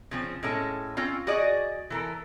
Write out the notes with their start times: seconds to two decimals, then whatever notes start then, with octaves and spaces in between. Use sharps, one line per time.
0.11 C#3 F3 C4
0.43 A2 G#3 C#4 A4
0.97 C4 C#4 F4
1.27 F#4 G#4 D5 D#5
1.90 E3 A4 A#4